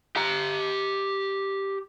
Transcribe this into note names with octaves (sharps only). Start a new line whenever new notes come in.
G4 A#5